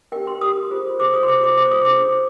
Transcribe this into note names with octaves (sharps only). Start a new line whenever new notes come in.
D4 G4 A#4 G5
C6
D4 G4 A#4 D#6
F4 G#4 C5
F4 G#4 C5 D6
D#6
C6
F4 G#4 C5 D6
D6
F4 G#4 C5 D6
D#6
D4 G#4 C5 D6